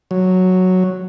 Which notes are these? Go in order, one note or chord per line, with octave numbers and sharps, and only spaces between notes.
F#3